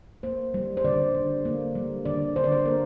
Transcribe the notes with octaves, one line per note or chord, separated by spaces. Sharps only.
A#3 C5
G3
C5
D3 D5
D3
A#3
G3
D3 D5
D3 C5
D5
C5
A#3 A#4